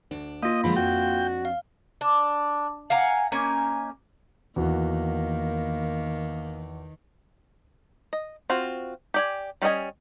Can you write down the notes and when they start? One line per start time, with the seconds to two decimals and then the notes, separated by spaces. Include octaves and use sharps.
0.11 D2 D4
0.43 A#3 F4 D#5
0.64 D3 F3 G#3 B5
0.76 F2 D4 F#4 G5
1.45 F5
2.01 D4
2.90 F5 F#5 G#5 A#5
3.32 A#3 C#4 D#4 G#5
4.56 E2 D#3 A#3 F#4
8.13 D#5
8.50 C4 F4 F#4
9.14 G4 D5 G#5
9.62 G3 C#4 F4 D#5 G#5